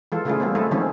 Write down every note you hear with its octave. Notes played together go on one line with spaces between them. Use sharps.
E3 G#3 F4 A4
C#3 G#3 A3 E4 F4 G#4
G3 G#3 A#3 C4
G#3 A3 E4 G#4 A4
D3 D#3 F3 G#3 C4 C#4